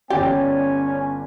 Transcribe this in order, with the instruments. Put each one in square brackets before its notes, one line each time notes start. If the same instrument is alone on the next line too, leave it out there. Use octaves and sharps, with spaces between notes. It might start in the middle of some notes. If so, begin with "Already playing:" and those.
[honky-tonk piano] G1 D5 A6 [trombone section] C#4 [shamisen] G4 [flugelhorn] G#5